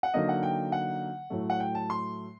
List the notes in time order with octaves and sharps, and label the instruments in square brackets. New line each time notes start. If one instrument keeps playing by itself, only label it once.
[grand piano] F#5
D3 F#3 A#3 D#4 D#5
F#5
G5
F#5
A2 F#3 A3
F#5
G5
A5
C6